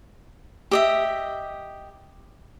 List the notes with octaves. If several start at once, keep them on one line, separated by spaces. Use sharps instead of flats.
G4 D#5 E5